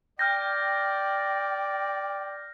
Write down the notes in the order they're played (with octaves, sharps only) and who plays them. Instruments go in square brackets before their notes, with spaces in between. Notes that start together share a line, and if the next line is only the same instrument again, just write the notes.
[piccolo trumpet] D5 [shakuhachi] G5 [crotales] F6 G6 A#6
[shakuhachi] G5